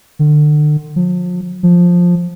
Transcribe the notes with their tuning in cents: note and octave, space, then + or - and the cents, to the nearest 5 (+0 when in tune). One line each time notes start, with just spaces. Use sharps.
D3 +35
F3 +40
F3 +10